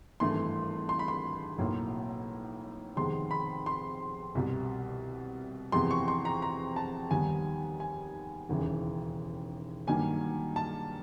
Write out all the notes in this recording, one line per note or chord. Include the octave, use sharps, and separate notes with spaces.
G#1 G2 E3 A3 C6
C6
B5
C6
B1 A2 F#3 A#3
F2 C3 D#3 G#3 B3 C6
B5
C6
C2 B2 G3
F2 C3 E3 G#3 B3 C6
C#6
C6
A#5
A#5
A5
D#2 D#3 G3 B3 G#5
G#5
E1 D#2 C#3 E3
G2 D#3 F#3 A#3 G#5
A5